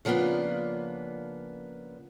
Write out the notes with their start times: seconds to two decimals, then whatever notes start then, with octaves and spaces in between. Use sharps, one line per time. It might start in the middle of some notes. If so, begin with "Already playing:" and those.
0.05 C#3 F3 A#3 B3 D4